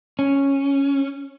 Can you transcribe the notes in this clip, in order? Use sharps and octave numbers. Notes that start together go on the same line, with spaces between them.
C#4